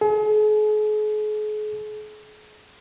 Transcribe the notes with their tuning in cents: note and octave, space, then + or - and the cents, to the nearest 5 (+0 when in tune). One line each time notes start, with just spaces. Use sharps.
G#4 +40